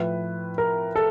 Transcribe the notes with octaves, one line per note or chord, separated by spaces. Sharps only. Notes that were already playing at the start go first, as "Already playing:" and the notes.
Already playing: A2 F3 B4
A#4
A4